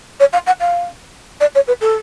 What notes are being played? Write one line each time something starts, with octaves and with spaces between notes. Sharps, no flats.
C#5
F5
F#5
F5
D5
C#5
B4
A4